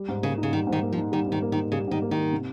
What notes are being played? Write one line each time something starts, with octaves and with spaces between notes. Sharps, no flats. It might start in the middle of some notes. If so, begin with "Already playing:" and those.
Already playing: G3
G#2
C#3 A#3
D#4
C#3
D#3 G3
G#2
D#3
A#3
F3
D#4
D#3 G3
G#2 D#3
A#3
D#3
D#4
C#3 G3
G#2 D#3
A#3
D#3
D#4
C3